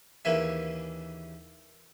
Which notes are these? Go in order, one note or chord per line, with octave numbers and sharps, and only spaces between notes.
D#2 C#3 E3 A#3 E5 G#5